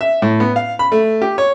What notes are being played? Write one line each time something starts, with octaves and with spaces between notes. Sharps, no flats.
E5
A2
B3
F5
B5
A3
G4
C#5